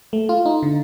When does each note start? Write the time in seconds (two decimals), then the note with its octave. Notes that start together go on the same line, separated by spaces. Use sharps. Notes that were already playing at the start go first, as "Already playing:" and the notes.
0.13 A3
0.29 F4
0.46 D#4
0.63 D3